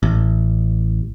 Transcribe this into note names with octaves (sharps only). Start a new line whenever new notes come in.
A1